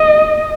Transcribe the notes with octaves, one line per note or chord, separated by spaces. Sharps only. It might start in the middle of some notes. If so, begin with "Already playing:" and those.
Already playing: D#5